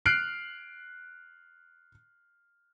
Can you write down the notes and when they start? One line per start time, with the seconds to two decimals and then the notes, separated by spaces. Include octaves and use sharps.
0.06 F6 F#6 C7 D7 F#7